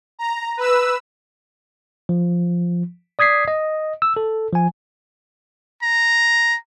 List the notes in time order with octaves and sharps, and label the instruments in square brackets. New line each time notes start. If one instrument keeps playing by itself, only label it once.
[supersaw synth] A#5
B4 E6
[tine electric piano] F3
D5 D#6 G#6 B6 C7
D#5
E6
A4
F3 G#5
[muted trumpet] A#5